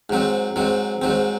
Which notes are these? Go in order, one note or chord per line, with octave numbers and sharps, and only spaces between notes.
G#2 F#3 C4
G#2 F#3 C4
G#2 F#3 C4